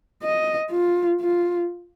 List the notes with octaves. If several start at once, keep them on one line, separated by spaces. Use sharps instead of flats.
D#5
F4
F4